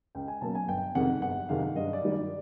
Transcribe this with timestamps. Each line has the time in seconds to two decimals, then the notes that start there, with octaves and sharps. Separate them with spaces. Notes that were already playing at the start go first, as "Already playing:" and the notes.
0.15 C#2 G5
0.28 G#5
0.41 B2 F#3 A#3 C#4 A5
0.55 G#5
0.68 G1 G5
0.95 F2 C3 D#3 G#3 F#5
1.21 G1 F#5
1.49 F2 C3 D#3 G#3 F5
1.76 G2 D#5
1.93 D5
2.02 D#3 G3
2.12 D5